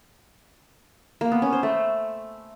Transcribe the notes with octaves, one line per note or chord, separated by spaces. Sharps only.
A#3
B3
C#4
C5
A3